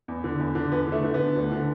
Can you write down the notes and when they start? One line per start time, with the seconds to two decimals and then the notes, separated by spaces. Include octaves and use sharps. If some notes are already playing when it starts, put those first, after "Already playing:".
0.08 E2
0.24 D3
0.39 E2
0.55 D3
0.72 E2 B3
0.88 D3 A3
1.04 D3
1.14 D3 B3
1.36 D2
1.52 D3